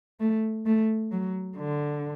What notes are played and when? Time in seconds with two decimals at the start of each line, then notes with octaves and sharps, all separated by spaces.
0.20 A3
0.66 A3
1.12 F#3
1.57 D3